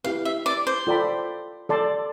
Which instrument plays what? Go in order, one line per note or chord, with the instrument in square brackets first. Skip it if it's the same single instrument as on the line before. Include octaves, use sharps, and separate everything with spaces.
[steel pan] E4 G4 B4 [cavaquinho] F5
[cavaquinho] E5
D5
C5
[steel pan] F4 A4 D5 G5 B5
A4 D5 A5 C6